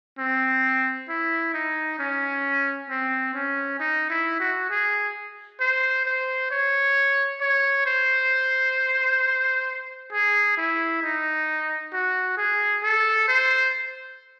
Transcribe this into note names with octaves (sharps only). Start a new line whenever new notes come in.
C4
E4
D#4
C#4
C4
C#4
D#4
E4
F#4
G#4
C5
C5
C#5
C#5
C5
G#4
E4
D#4
F#4
G#4
A4
C5